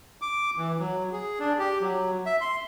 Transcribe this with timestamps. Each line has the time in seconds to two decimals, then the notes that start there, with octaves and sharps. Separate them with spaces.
0.22 D6
0.57 E3
0.80 F#3
1.12 G#4
1.40 D4
1.59 G4
1.81 F#3
2.26 E5
2.41 C6